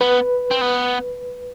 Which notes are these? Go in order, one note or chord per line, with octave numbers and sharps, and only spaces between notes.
B3 B4
C4
B3